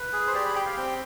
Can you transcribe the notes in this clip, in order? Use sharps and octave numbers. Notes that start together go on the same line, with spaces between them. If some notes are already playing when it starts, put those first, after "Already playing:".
Already playing: B4
G#4
C5
G4 D5
B5
G4 G5
F5
C4 G5